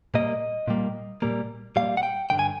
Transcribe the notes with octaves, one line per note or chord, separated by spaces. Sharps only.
A#2 G3 A#3 D#5
A#2 G3 A#3
A#2 G3 A#3
A#2 G3 A#3 F5
F#5
G5
G2 D3 F3 G5
G#5